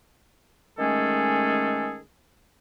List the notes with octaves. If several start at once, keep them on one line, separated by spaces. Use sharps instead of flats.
D#3 G#3 A3 C#4 G#4 A4